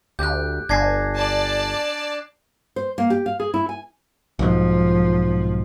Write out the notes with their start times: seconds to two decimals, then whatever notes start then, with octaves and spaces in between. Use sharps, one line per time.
0.19 D2 G4 F#6 G6
0.69 G1 D4 G#5 G#6 A#6 C7
1.16 D5 A5
2.76 C5
2.98 A#3
3.10 G4
3.26 F5
3.40 G#4
3.54 E4
3.69 G#5
4.39 B1 G#2 F3